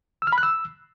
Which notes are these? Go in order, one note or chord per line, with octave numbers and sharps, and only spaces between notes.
E6
F6
B5
F#6
E6